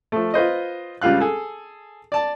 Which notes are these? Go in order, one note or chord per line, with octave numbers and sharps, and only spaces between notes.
F3 A3
F4 B4 C5 D#5
C#2 G3 F4 F5 F#6
G#4 A4
D5 A5